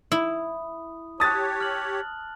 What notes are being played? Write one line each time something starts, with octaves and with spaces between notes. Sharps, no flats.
E4 D#6
G4 C#5 A5 D#6 F#6 A6
F6 F#7